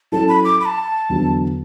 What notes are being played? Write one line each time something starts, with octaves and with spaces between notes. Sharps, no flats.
F#3 C#4 E4 A4 A5
B5
D6
B5
A5
E2 D3 F#3